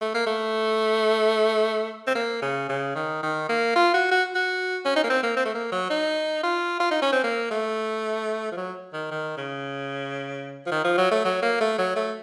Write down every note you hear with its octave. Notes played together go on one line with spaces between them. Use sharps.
A3
A#3
A3
C4
A#3
C#3
C#3
D#3
D#3
A#3
F4
F#4
F#4
F#4
C#4
D#4
A#3
C4
A#3
C4
A3
A#3
F#3
D#4
F4
F4
D#4
C#4
C4
A#3
A3
F3
F#3
D#3
D#3
C#3
F3
D#3
F3
F#3
A3
F#3
A#3
A3
F#3
A3